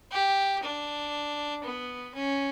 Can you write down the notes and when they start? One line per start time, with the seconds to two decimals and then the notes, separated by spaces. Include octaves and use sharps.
0.12 G4
0.63 D4
1.64 B3
2.15 C#4